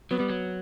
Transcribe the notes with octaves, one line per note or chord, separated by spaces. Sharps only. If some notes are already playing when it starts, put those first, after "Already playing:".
F#3 B3
G3
F#3